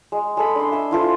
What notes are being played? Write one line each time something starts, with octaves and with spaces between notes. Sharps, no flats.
G#3
G#3 A4 B5
D4 C6
E5 G#5
E4 F4 A4 C5